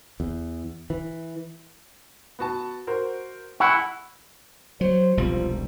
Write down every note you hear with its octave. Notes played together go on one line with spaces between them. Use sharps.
E2
E3
B3 F#4 A5
F#4 A#4 C5
E4 F#5 G#5 B5 C#6
F#3 C5
E1 C2 F3 G3